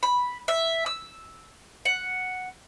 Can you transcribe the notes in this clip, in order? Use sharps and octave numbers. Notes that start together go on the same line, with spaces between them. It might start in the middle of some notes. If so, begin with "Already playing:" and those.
B5
E5
E6
F#5